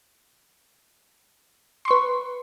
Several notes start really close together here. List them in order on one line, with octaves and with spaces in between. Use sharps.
C6 C#6 B4